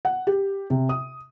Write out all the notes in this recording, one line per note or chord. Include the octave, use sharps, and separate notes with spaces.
F#5
G4
C3
D#6